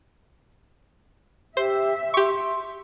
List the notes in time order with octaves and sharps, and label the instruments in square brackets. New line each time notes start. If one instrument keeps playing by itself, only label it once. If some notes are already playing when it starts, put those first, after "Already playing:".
[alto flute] G4 [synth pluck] C5 [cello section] E5
[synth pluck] G4 C#6 [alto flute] C6